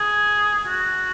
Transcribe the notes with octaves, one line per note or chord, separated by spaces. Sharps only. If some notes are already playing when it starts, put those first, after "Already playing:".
Already playing: G#4
F#4